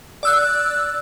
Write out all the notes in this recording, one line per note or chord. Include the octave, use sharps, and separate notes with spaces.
D5 E6 F#6